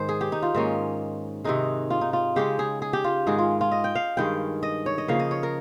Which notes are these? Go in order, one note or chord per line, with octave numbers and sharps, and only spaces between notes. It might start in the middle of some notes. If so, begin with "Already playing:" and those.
Already playing: G#2 D#3 C5
G#4
G4
D#4
F4
G#2 D#3 A#3 C#4
C3 D#3 G#3 D#4
F4
D#4
F4
C#3 G#3 C#4 G4
G#4
G#4
G4
F4
G#2 D#3 G#3 G#4
F4
F4
D#5
G5
F5
G2 D#3 G#3 G5
D#5
C#5
D#5
C#3 F3 A#3 F5
D#5
C#5
A#4